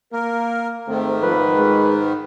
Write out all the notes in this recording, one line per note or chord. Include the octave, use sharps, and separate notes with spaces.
A#3 A#4
G#2 D#3 A3 C4
F3 B4
G#3